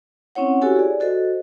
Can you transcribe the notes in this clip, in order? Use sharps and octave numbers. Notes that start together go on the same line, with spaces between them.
C4 C#4 E4 C#5 F#5
E4 F#4 G4 A4 C#5 G#5
G#4 D5
F#4 A4 C5 D#5